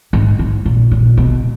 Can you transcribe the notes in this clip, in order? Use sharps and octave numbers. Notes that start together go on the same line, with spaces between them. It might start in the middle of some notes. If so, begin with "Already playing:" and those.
G#2
G#2
A#2
A#2
B2